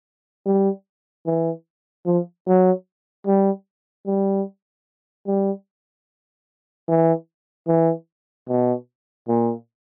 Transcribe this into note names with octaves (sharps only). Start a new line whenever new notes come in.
G3
E3
F3
F#3
G3
G3
G3
E3
E3
B2
A#2